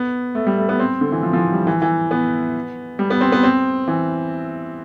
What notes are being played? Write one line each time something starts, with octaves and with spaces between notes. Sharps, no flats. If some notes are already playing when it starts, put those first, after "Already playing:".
Already playing: B3
A3
G3
A3
B3
C4
D3
E3
F3
F3
E3
G3
E3
E3
B3
G3
B3
C4
B3
C4
E3